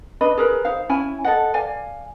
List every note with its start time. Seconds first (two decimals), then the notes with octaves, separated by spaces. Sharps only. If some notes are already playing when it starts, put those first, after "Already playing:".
0.21 D4 B4 D#5 B5
0.38 G#4 A#4 B4
0.65 D#4 C5 F5
0.89 C#4 E4 G#5 B5
1.24 A4 D#5 F#5
1.54 D5 F5 G#5